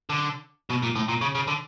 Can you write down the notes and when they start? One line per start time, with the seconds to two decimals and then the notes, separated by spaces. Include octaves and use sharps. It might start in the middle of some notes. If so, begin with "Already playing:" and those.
0.09 D3
0.70 B2
0.83 A#2
0.95 A2
1.08 A#2
1.21 C#3
1.35 C#3
1.47 D3